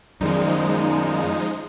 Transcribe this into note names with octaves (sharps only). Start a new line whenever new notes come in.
F#2 D#3 F3 G3 G#3 D#4